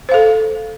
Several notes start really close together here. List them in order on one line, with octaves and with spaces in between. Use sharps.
C5 F5 A4